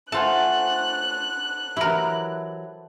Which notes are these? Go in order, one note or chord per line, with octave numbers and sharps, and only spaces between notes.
A3 F4 A4 C5 F#5 G#5 A5 F#6
E3 F#3 E4 G4 A#4